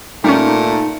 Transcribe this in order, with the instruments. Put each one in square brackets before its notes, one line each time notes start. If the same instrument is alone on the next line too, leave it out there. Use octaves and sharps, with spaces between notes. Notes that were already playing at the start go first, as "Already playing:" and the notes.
[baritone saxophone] A#2 [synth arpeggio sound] G3 C#4 [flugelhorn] A3 [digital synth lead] D#4